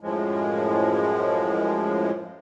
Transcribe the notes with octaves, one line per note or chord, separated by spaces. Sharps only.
F#2 A2 F3 G#3